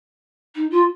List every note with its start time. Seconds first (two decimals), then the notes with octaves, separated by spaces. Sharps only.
0.55 D#4
0.70 F4